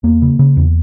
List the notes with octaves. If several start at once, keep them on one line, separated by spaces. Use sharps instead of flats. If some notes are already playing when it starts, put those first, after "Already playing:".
E2 A#3
C#3
C#3
E2